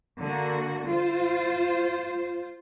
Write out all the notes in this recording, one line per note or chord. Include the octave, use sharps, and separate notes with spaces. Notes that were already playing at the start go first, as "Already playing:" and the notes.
D3 A#3 F#4
F4 C5